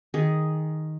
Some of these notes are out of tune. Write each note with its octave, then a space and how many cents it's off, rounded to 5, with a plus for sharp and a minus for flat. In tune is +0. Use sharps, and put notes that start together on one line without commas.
D#3 +5 G#4 +0